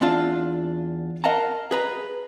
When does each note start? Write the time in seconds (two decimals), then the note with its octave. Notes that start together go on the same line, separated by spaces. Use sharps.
0.01 E2 C4 D4 F4 A5
1.24 A#4 D#5 F5 F#5 A5 A#5
1.71 G#4 B4 A#5